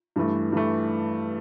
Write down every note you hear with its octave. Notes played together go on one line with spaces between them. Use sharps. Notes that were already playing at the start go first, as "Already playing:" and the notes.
G2 E3 A3
G2 E3 A3